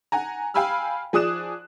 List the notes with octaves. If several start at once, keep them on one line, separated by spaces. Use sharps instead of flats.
F#5 G#5 A#5
F5 G5 G#5 B5 E6 F6
F3 G#4 D5 D#6 F#6 E7